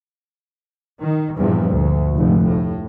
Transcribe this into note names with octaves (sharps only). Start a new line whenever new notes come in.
D#3
E2 G2 A#2 F3
D2
F1 G#2
A2